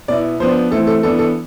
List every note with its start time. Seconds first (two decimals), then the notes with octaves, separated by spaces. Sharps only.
0.08 B2 B3 E4 D5
0.40 F3 B3 D4 C5
0.71 E3 A3 C4 A4
0.87 A4
1.03 E3 B3 D4 A4
1.19 A4